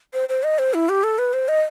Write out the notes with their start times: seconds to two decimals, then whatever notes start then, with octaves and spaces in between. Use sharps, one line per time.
0.13 C5
0.29 C5
0.43 D#5
0.59 C5
0.74 E4
0.89 G4
1.03 A4
1.18 B4
1.33 C5
1.48 D#5